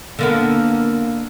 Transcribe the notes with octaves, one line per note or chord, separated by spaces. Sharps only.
D3 A#3 B3